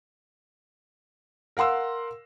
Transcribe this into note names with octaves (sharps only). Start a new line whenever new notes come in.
A#4 F5 F#5 C6 E6